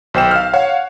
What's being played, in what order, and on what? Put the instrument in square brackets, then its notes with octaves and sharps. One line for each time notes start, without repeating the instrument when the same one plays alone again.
[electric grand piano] B1 C5 G5 E7
F5 F6
C#5 F5 F#5